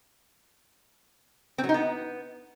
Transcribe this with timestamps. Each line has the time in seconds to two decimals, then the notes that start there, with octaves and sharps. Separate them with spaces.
1.58 C4
1.64 F#3
1.69 D#4
1.74 B3